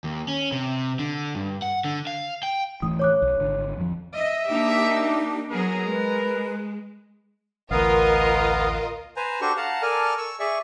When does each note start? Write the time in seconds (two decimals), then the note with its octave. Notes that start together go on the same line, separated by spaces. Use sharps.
0.04 D#2
0.28 C#4
0.52 C3
0.99 D3
1.35 G2
1.62 F#5
1.85 D3
2.07 F5
2.43 G5
2.82 D1 A2 E3 D#6
2.99 C#5 D6 F#6
3.22 B1
3.39 G#1 D3
3.77 F2 F3
4.15 D#5 E5
4.50 A#3 D4 D#4 G4
5.52 F#3 B3 G#4 A#4
5.88 G#3 B4
7.71 A1 D2 B3 F4 A#4 D#5 F5
9.16 B4 C5 G#5 A#5
9.41 D4 F#4 G4 A4 C5 C#6
9.57 F5 F#5 A5 A#5
9.82 A4 A#4 D5 G#5 F6
10.18 C#6 E6
10.40 G#4 D5 E5 C#6